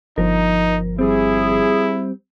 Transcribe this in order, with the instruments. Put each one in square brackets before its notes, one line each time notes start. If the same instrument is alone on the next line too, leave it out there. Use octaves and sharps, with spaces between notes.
[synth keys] G1 F3 [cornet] D#4 [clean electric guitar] A#4
[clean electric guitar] G3 C4 [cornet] E4 [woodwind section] G#4